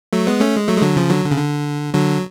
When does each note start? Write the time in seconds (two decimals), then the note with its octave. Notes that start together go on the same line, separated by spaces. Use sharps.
0.13 F#3 A3
0.27 G#3 B3
0.41 A3 C#4
0.57 G#3
0.69 F#3 A3
0.78 G#3
0.82 D3 F#3
0.96 C#3 F3
1.10 D3 F#3
1.24 D3
1.31 C#3
1.38 D3
1.94 D3 F#3